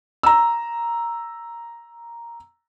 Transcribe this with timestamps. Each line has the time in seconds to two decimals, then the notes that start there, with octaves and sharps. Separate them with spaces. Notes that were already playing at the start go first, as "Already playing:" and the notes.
0.23 A#5 E6